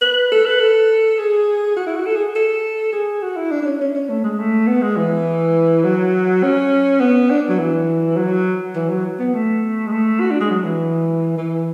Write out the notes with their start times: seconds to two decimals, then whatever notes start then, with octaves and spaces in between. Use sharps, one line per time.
0.01 B4
0.32 A4
0.45 B4
0.60 A4
1.19 G#4
1.76 F#4
1.86 E4
1.96 F#4
2.06 A4
2.16 G#4
2.36 A4
2.93 G#4
3.22 F#4
3.36 E4
3.51 D4
3.62 D4
3.66 C#4
3.81 C#4
3.95 C#4
4.10 A3
4.24 G#3
4.39 A3
4.67 B3
4.82 G#3
4.97 E3
5.85 F#3
6.43 C#4
7.00 B3
7.30 D4
7.49 F#3
7.59 E3
8.17 F#3
8.76 E3
8.90 F#3
9.19 B3
9.34 A3
9.87 G#3
9.92 A3
10.21 F#4
10.31 D4
10.41 G#3
10.51 F#3
10.65 E3
11.38 E3